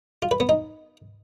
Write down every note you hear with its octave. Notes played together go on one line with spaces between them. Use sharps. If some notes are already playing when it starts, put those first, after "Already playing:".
F4
B4
B3
D#4